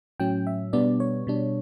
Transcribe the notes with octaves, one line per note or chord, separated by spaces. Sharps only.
A2 F#3 C#4 G5
E5
B2 G3 B3 D4 D5
C#5
B2 G3 D4